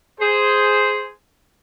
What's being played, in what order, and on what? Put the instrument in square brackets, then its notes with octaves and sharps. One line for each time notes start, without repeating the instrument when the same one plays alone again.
[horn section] G#4 C5